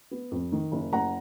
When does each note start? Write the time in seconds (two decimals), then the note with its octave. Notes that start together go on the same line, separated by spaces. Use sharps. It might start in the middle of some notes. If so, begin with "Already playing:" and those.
0.11 B3
0.31 F2
0.52 D#3
0.72 F#1
0.92 F#1 F#5 A#5